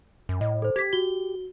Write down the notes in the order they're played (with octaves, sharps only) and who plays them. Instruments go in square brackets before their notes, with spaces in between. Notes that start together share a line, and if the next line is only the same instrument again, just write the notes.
[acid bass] F#2
[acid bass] A2 [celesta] D#5
[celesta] A4 C5
[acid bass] G4 [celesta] G#6 B6
[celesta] F#4 G7